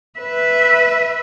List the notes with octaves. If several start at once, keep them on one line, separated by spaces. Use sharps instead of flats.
B4 E5